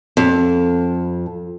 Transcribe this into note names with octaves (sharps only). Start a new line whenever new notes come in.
F2